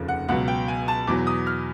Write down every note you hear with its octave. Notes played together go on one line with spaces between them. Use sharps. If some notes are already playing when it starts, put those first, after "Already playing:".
Already playing: F1 D#2 C#3 F3
F#5
C#2 B2 F#3 F#5
G5
G#5
A5
E2 B2 F#3 D6
D#6
F6